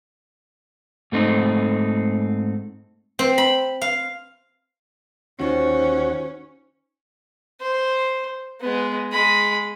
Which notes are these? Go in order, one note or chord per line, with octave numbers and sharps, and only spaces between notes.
G#2 A3 C4 D#4
C4
B5
F5
D#2 C#4 D#4 F4 F#4 C5
C5
G#3 B3
G#3 B5